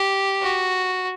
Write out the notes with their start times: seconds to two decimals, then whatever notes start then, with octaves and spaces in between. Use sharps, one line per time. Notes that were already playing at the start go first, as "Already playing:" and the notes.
Already playing: G4
0.42 F#4